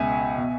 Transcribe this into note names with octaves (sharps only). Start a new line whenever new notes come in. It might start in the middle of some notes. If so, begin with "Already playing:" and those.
Already playing: C#2 B2 E5 G#5
B2